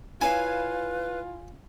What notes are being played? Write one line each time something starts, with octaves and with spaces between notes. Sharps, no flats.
E4 F4 B4 C#5 F5 G#5